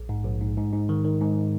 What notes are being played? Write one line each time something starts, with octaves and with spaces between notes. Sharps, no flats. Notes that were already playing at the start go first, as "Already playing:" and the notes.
Already playing: A#1
G#2
A#1
G#2
G#2
G#2
D#3
D#3
G#2